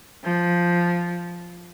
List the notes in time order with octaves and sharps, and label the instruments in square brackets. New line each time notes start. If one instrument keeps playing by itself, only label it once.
[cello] F3